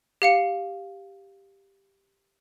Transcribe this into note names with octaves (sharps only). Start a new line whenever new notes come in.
G4 F5 C#7